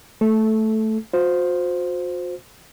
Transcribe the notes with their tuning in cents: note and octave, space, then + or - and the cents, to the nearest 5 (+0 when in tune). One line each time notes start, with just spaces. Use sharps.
A3 +0 A4 -15
F#4 -45 C5 -5